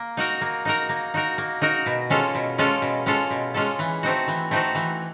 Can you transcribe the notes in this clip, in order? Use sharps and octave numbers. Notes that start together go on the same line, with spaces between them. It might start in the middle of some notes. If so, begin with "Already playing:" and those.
Already playing: A#3
D#4 F#4 A#4
A#3
D#4 F#4 A#4
A#3
D#4 F#4 A#4
A#3
D#4 F#4 A#4
B2
G#3 C#4 F4 A4
B2
G#3 C#4 F4 A4
B2
G#3 C#4 F4 A4
B2
G#3 C#4 F4 A4
E3
A3 C4 D#4 F#4
E3
A3 C4 D#4 F#4
E3